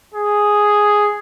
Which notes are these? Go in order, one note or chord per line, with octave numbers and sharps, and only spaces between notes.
G#4